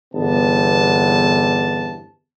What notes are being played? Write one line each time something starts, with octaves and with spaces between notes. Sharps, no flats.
G1 E2 C3 B3 A5